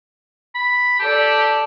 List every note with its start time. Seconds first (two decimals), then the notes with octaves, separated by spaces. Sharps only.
0.55 B5
0.99 G4 A4 D5